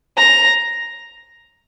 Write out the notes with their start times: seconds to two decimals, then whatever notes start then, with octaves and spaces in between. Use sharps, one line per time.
0.18 A#5